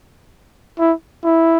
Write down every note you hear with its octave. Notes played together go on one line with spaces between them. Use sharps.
E4
E4